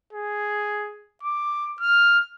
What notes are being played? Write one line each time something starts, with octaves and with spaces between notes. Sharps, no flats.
G#4
D6
F6